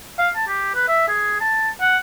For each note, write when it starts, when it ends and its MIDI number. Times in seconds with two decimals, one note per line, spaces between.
0.19 0.29 77
0.36 0.46 81
0.48 0.72 67
0.75 0.87 71
0.88 1.08 76
1.08 1.39 68
1.41 1.69 81
1.81 1.97 78